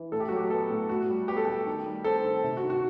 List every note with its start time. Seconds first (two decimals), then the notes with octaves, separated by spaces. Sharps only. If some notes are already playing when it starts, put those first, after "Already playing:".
Already playing: E3
0.12 A2 A4
0.20 G4
0.29 F#3 F#4
0.36 G4
0.50 B3 A4
0.70 A2
0.89 A2 F#4
1.09 G3
1.28 B3 G4
1.37 A4
1.45 A2 G4
1.67 D#3
1.86 G3
2.04 C4 A4
2.24 D#3
2.44 C3
2.57 F#4
2.63 D#3
2.70 F#4